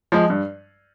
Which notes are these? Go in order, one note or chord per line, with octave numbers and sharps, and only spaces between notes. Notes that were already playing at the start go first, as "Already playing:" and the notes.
F3 G#3
G2